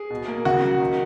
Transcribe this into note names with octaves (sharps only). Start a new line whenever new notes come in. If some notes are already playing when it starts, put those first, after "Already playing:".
Already playing: G#4
B2
A#3
C#3 F#4
F#3
D#3